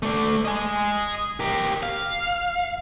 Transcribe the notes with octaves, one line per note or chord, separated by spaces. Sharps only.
A3 D5
D#5 G#5
G4 A#4
F5